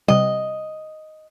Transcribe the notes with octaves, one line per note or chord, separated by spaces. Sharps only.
C3 G3 D#5